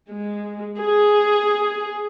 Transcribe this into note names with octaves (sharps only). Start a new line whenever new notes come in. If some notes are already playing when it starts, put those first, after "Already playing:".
G#3
G#4